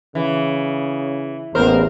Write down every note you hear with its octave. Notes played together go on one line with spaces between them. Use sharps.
C#3 E3
A1 E2 A#3 A#4 C5